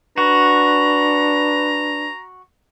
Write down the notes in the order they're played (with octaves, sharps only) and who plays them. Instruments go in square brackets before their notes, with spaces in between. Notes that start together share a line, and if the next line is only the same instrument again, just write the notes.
[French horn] D4 [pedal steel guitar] F#4 [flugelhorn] B4 [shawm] A#5